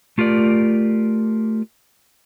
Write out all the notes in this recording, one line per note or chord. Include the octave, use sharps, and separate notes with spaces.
A3 F4 G4 A#4 D5